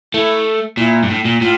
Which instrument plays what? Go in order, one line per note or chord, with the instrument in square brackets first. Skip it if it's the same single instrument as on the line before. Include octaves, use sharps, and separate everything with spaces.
[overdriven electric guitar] A3 [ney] E4
[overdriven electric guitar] A#2 [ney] E4
[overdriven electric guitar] G2
A2
A#2
[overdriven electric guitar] A2 [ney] F4